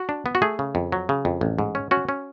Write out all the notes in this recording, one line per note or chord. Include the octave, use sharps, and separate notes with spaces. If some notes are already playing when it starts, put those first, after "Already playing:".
Already playing: F#4
D4
B3
F#4
A3 G#4
C#3
F2
F#3
C#3
F2
A1
G#2
C#4
C#4 F#4
C#4